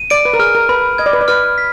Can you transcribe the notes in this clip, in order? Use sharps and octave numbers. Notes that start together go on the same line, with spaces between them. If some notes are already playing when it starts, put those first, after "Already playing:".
Already playing: D#7
D5 D7
B4
A#4
G#4 F6
A#4
B4 B5
D#5 G#6
D5
B4
D5
B4 F6
B6